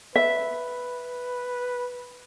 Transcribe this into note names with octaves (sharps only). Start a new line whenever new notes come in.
B4 E5